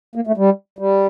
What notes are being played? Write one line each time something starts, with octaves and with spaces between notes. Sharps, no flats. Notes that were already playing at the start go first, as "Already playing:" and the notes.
A#3
A3
G3
G3